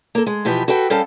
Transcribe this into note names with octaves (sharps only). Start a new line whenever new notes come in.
A#3 A4
G#3
B2 E3 F3 G4 B4
F#4 A4 B4 G5
G3 C#4 A4 C5 F5 G5